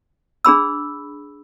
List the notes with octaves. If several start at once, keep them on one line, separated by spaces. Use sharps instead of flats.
D4 G#4 B5 E6